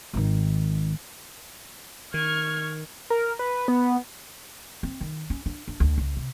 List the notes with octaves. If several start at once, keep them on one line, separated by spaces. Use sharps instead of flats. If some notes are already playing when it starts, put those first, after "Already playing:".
G#1 D#3
D#3 C#6 F6 G#6
A#4
B4
B3
C4
D#3
C#4
D4
D4
D2
C#2
C3